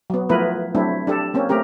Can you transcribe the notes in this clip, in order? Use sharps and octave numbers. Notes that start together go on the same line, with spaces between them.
F#3 B3
F3 A3 B3 E4 A#4 B4
F#3 A3 C4 D4 E4
D4 G4 A4
A#3 C4 C#4
A3 C4 G4 A#4